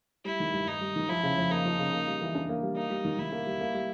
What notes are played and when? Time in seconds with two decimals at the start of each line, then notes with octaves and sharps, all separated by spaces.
0.25 G3 E4
0.40 D#3
0.53 G2
0.67 G2 D#4
0.81 G3
0.96 D#3
1.09 F3 E4
1.23 C#3
1.38 F2
1.50 A#3 D#4
1.65 F3
1.79 C#3
1.93 A#3
2.07 G3
2.21 E3
2.35 D4
2.49 A#3
2.63 G3
2.77 A#3 D#4
2.90 G3
3.05 D#3
3.18 D#3 E4
3.32 A#3
3.47 G3
3.61 A#3
3.74 G3